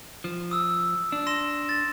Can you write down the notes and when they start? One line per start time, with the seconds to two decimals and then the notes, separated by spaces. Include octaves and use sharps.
0.24 F3
0.51 D#6 E6
1.12 D4
1.27 C6 A#6 E7
1.69 A6